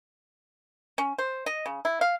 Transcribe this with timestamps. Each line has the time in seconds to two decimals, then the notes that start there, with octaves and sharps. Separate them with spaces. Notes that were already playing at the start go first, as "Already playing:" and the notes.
0.98 C#4
1.18 C5
1.46 D#5
1.66 C#3
1.85 E4
2.01 F5